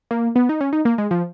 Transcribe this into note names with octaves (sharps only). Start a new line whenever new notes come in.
A#3
B3
D#4
C#4
D#4
A#3
G#3
F3